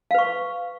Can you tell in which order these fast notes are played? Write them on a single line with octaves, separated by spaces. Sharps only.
F5 B4 C#6